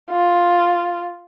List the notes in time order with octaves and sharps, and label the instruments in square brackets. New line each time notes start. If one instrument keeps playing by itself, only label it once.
[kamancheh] F4